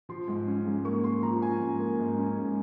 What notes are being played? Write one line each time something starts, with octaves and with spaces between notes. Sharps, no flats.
F3 C6
G#2
C#4
G#2
A#3 C#6
A#3 C6
F3 A#5
C#4 G#5
G#2
A#3
G#2
C#4
G#2